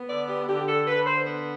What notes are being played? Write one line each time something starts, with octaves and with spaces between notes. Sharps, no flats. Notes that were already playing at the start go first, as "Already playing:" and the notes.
Already playing: B3
D3 D5
G4
D3 G4
A4
D3 B4
C5
B3